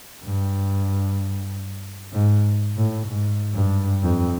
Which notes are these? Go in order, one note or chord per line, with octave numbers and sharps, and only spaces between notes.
G2
G#2
A2
G#2
G2
F2